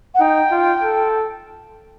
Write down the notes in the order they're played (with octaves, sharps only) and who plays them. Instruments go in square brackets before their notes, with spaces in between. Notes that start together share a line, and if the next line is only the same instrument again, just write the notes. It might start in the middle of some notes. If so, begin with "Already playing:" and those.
[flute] F#5
[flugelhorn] D#4 [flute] G5
[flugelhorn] F4
A4